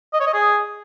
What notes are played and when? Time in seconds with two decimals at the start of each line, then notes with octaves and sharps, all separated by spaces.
0.13 D#5
0.20 C#5
0.27 D#5
0.33 G#4